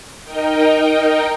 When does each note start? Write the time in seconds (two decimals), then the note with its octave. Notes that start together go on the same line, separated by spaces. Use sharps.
0.24 D#4 A#4 D#5 G5